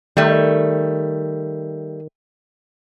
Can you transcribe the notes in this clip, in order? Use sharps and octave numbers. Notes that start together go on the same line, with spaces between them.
D#3 G3 A3